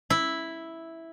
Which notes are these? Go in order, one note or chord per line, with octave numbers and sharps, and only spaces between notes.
E4